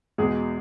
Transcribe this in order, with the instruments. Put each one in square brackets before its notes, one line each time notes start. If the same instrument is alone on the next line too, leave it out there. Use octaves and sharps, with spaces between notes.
[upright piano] E2 B2 G#3 G#4